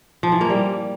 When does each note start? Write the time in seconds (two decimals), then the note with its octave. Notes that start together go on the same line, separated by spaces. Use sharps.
0.23 F3
0.32 E3
0.41 A#3
0.50 G3